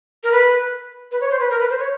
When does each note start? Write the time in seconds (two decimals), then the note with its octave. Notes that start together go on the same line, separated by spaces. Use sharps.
0.24 A#4
0.32 B4
1.11 B4
1.21 C#5
1.31 C5
1.40 B4
1.50 A#4
1.60 B4
1.70 C5
1.79 C#5